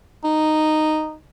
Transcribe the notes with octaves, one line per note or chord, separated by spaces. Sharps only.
D#4